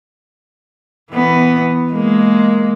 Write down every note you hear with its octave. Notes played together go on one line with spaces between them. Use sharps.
E3 B3
G#3 A#3